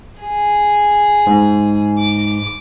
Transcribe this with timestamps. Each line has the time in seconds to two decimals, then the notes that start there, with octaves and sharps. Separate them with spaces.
0.21 G#4
1.27 G#2
1.99 D6